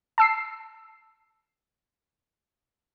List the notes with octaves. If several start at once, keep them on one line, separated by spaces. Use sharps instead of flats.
A5 E6 C7